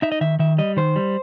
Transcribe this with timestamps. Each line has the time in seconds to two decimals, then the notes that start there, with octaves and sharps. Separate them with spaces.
0.02 D#4 E5
0.12 D#5
0.21 D#3 E5
0.39 D#3 E5
0.58 G3 D#5
0.77 D#3 C5
0.96 G3